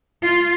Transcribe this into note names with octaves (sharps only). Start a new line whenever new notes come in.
F4